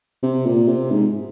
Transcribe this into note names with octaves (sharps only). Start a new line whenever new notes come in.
C3
A#2
C3
G#2